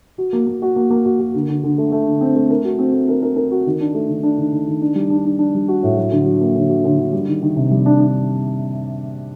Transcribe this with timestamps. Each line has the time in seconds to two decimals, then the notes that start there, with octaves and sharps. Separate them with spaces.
0.18 F#4
0.33 A#3
0.47 A#3
0.62 F#4
0.76 A#3
0.90 A#3
1.05 F#4
1.20 F#4
1.34 D3
1.49 D3
1.63 D3
1.78 A3
1.92 A3
2.06 D3
2.21 C4
2.36 A3
2.50 A#4
2.65 F#4
2.79 C4
2.94 A3
3.08 A#4
3.22 A#4
3.36 A#4
3.51 F#4
3.66 D#3
3.80 D4
3.94 A3
4.08 D#3
4.23 D4
4.38 D#3
4.52 D#3
4.67 D#3
4.81 D4
4.95 G3
5.10 D4
5.25 D4
5.39 D4
5.54 G3
5.68 F#4
5.83 A2
5.97 F#3
6.11 D3
6.26 F#3
6.41 A#3
6.55 D3
6.69 F#3
6.84 D3
6.98 D3
7.12 G3
7.28 D#3
7.42 D#3
7.56 C3
7.71 G3
7.86 D4
8.00 D4